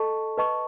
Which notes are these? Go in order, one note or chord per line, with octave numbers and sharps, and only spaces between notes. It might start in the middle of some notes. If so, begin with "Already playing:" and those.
Already playing: A4 D#5 A5 C#6
B4 D#5 A5 C#6